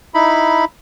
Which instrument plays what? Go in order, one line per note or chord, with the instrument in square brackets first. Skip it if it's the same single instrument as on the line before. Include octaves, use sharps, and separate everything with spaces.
[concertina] D#4 E4 B5